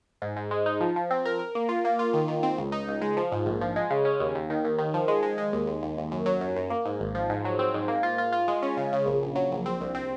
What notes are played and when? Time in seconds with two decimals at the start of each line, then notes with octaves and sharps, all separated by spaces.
0.22 G#2
0.36 G#2
0.51 G#3
0.66 D#4
0.80 F3
0.96 F3
1.11 C4
1.26 A#4
1.39 A#4
1.55 A#3
1.69 F4
1.85 A#3
1.99 F4
2.14 D#3
2.28 D#3
2.43 C4
2.58 C#2
2.72 D#4
2.88 C#2
3.02 G#3
3.17 F3
3.32 G#2
3.46 A#1
3.61 F3
3.76 G#3
3.90 C#3
4.05 C#4
4.20 D#2
4.35 D#2
4.50 D#3
4.65 D#2
4.78 D#3
4.94 F3
5.08 G#3
5.23 G#3
5.38 G#3
5.53 D#2
5.67 D#2
5.83 D#2
5.97 D#2
6.12 F#2
6.26 F#3
6.41 F#2
6.56 F#2
6.70 A#3
6.85 G#2
7.00 G#1
7.15 F3
7.29 G#2
7.45 F#3
7.59 C4
7.74 G#2
7.88 A#3
8.03 F4
8.18 F4
8.32 F4
8.48 G#3
8.62 C#4
8.77 C#3
8.93 C#3
9.06 A#1
9.22 A#1
9.36 F#3
9.52 A#1
9.66 C4
9.81 C2
9.95 C4